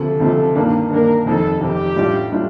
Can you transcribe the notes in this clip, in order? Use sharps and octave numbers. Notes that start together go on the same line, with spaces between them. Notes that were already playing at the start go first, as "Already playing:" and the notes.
Already playing: D2 C3 F3 A4
D2 C3 F3
G2 D#3 A#3 D4
G2 D#3 A#3 D4 A#4
F1 F2 D#3 A4
F1 F2 D#3 G4
A1 A2 G3 D4 F4
A2 G3 D4 F4